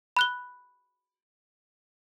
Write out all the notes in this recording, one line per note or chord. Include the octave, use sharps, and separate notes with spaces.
B5 F#6 G7